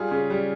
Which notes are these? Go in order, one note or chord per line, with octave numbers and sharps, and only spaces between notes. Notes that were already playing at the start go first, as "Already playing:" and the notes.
Already playing: G3 F4 G#4
C#3
G3